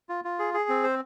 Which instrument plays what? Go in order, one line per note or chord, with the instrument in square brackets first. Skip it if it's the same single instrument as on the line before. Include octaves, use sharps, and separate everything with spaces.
[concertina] F4
F4
G#4
G#4
C4
C5